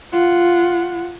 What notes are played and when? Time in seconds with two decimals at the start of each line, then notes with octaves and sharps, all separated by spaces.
0.13 F4 F#5